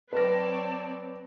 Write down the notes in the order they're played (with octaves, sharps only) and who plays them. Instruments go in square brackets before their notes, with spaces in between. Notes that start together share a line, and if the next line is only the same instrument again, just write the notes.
[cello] F#3 D5 [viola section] C4 C#5 [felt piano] B4 A#6 [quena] A5